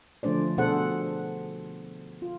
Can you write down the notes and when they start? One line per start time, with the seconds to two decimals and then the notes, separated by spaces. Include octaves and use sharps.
0.23 D3 F3 A3 D4 C5 D5
0.58 B2 D4 G#4 A4 C5 F#5
2.22 F4